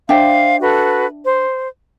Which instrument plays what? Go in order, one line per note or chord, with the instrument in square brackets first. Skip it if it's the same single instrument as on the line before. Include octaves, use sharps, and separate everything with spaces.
[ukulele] D4 E5 G5 [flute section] C5 F5
[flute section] F#4 A4 B4
C5